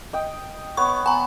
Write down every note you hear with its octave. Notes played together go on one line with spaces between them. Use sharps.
D#5 G5
B3 C#5 C#6
B3 G#5 A#5